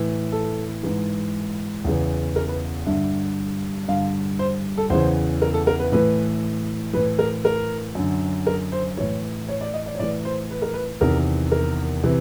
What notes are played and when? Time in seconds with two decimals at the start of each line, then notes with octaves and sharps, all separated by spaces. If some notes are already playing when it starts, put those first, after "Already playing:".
Already playing: A2 E3
0.32 A4
0.83 G#2 E3
1.84 E2 C#3 E3
2.36 A#4
2.49 B4
2.87 G2 D3 E5
3.88 G2 D3 F5
4.39 C5
4.78 A4
4.90 E2 C#3 E3 C5
5.42 A#4
5.54 A4
5.67 A#4
5.80 B4
5.92 A2 E3 B4
6.93 E3 B4
6.97 A2
7.19 A#4
7.45 A#4
7.95 F#2 D3
8.47 A#4
8.72 C5
8.97 A2 E3 C#5
9.49 C#5
9.61 D5
9.74 D#5
9.86 D5
9.95 C#5
9.99 A2 E3 D5
10.25 C5
10.51 B4
10.62 A#4
10.73 B4
11.01 E2 C3 D#3 A#4
11.52 A#4
12.04 C3 E3